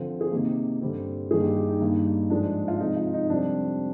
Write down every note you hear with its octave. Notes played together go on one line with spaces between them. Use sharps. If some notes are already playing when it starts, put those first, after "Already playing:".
Already playing: D3 F3 C4 F4
G#4
C3 D#3 A#3 G4
G2 D3 G3 C4
G2 D#3 A#3 G#4
G4
G4
D#4
G2 D#3 G3 A#3
G#2 F3 G#3 D4
F4
C3 F3 G#3 D#4
F4
D#4
F2 C3 G3 C4 D4